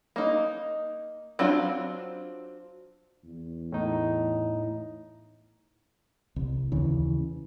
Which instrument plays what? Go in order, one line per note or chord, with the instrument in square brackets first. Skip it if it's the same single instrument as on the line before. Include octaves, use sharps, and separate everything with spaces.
[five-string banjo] A#3 D#4
F#3 C4 D4 F4
[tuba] E2
[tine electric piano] A2 D#4
[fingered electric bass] C2
D#2 C#3 E3